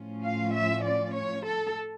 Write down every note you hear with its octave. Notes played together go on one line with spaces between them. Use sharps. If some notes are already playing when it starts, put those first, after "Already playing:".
Already playing: A2 F3 C#4 F4
F5
E5
D5
C#5
A4